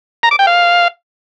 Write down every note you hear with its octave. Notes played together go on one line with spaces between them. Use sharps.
A#5
D6
G5
F5